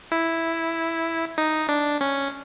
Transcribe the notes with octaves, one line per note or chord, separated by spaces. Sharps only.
E4
D#4
D4
C#4